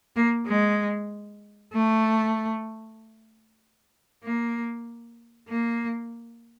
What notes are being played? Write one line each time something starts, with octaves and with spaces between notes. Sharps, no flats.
A#3
G#3
A3
A#3
A#3